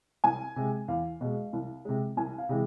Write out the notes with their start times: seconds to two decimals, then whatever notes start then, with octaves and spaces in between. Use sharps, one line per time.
0.24 C2 G#5
0.56 C3 G#3
0.88 E2 F5
1.21 B2 G#3
1.53 C2
1.85 C3 G#3
2.17 C2 G#5
2.38 F5
2.49 C3 E3 G#3